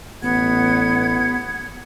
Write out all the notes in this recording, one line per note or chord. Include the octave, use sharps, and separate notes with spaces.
A1 B3 F#5 G#6